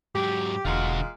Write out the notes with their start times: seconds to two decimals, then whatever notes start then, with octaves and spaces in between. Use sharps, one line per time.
0.15 G#2 F#3 G4
0.65 E1 A#2 D3 G#3 F#4 F5